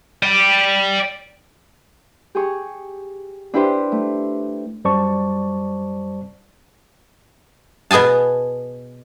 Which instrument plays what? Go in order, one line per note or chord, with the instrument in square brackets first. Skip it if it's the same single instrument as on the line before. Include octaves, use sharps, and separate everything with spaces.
[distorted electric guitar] D5 G5
[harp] G4 G#4 C#6
D4 E4 G4 B4 C5
A3
[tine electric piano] F#2 G3 C5 D5 A5 C#6
[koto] B2 B3 G#4 G#5 A5